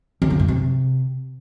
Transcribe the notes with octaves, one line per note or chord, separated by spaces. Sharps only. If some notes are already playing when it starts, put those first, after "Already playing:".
E2
C#3
G2
C3